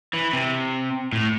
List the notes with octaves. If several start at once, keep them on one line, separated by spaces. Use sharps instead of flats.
E3
C3
A2